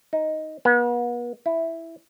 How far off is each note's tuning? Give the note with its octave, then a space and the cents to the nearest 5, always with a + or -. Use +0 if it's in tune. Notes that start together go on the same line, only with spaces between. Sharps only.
D#4 +5
B3 -40
E4 +0